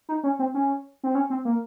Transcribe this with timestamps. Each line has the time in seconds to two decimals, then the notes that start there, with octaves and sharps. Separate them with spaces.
0.09 D#4
0.24 C#4
0.39 C4
0.54 C#4
1.04 C4
1.15 C#4
1.30 C4
1.45 A#3